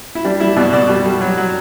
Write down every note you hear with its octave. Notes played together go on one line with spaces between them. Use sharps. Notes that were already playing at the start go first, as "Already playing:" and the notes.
E4
G3 D4
G3 E4
B2 D5
B2 D5
G3
G3
F#3
F#3